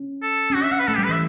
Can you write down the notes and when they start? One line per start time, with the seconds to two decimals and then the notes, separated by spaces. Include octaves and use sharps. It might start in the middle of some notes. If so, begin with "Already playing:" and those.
Already playing: C#4
0.22 A4
0.50 C#4
0.54 D4 F#4
0.63 E5
0.71 C#4 F#5
0.79 B4
0.87 A3 A4
0.96 G3 G4
1.04 B4
1.09 E3 E5